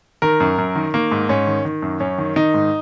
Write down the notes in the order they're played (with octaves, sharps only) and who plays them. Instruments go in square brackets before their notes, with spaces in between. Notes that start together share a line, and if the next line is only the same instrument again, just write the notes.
[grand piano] D#3 A#4
F#2
F#2
D#3
D#3 A#3
G#2
G#2 C#4
D#3
D#3
F#2
F#2 C#4
D#3
D#3 D#4
G#2